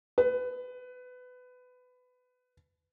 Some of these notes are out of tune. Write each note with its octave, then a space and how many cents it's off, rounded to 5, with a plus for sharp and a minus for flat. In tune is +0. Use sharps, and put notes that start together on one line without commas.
B4 +20